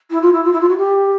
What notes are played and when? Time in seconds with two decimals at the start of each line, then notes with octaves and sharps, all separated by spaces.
0.10 E4
0.21 F4
0.32 E4
0.44 F4
0.52 E4
0.60 F4
0.68 F#4
0.77 G4